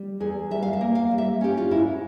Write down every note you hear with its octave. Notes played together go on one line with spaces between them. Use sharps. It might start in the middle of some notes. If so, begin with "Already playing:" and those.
Already playing: G3
E2 G#4
G3 E5
F5
E5
A#3
F5
G3
E5
C#4 G4
F4
G#2 E4